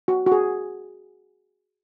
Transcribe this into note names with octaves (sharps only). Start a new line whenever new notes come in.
F#4
F#4
G#4